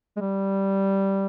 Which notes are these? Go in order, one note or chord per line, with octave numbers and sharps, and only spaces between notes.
G#3
G3